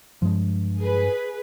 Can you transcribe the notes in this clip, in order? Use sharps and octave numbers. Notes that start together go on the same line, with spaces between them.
G2 F3 G#3
G#4 B4